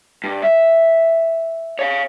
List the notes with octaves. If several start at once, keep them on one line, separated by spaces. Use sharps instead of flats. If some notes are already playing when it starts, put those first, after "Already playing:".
G2
E5
C#5 F5